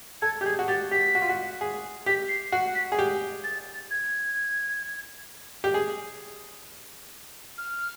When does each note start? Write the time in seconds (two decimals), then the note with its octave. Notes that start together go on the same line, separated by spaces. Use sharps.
0.22 A4 G#6
0.41 G4 G6
0.46 G#4 G#6
0.59 F#4
0.68 G4 A6
0.91 G4 B6
1.15 F#4
1.22 F4
1.29 F#4
1.61 G#4
2.06 G4 B6
2.29 C7
2.52 F#4 C7
2.75 B6
2.92 G#4
2.99 G4
3.44 A6
3.91 G#6
5.64 G4
5.74 G#4
7.58 F6